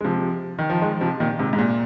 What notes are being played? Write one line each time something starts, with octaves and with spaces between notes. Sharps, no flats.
G#3
C3 F3
D#3
F3
D#3 G#3
C3 F3
A#2 D#3
G#2 C3
G#2
A#2